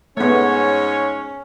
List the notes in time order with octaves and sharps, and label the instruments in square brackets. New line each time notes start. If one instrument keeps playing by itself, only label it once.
[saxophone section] G#2 C#5 [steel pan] A3 B3 [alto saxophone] C#4